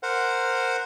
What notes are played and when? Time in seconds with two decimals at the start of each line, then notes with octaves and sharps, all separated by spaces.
0.03 A#4 C5 F#5